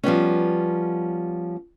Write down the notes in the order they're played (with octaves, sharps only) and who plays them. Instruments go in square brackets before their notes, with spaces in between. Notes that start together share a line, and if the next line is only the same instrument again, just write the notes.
[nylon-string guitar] F3 G3 B3 C#4